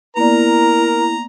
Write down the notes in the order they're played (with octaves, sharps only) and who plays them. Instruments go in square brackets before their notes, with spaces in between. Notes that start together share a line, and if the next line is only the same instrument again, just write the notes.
[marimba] A#3 B3 D5 [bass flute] E4 [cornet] A#4 [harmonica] A#5